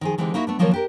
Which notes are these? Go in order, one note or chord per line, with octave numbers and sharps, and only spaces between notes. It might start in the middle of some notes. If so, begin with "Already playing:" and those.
D#3 F3 G#4
D3 E3 G#3 C4 D#4 G4
A#3 D#4 E4 F#4 E5
A3 B3 D4
D#3 F3 F#3 A#3 A#4 C#5
D4 G4 A#4